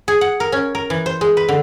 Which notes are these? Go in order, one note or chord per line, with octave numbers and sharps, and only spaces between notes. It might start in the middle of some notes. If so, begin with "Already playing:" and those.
G#4
F#5
A#4
C#4
A#4
E3
C5
G#3
B4
D3